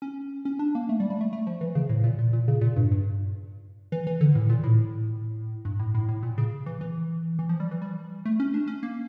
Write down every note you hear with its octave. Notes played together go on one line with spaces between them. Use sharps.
C#4
C#4
D4
A#3
A3
G3
G3
A3
A3
F3
E3
C#3
A2
A#2
A#2
A#2
C#3
A#2
G2
G2
E3
E3
D3
A2
A#2
A2
G2
A2
A2
A2
A#2
C#3
E3
E3
E3
F3
G3
E3
G3
A3
C#4
D4
C#4
A#3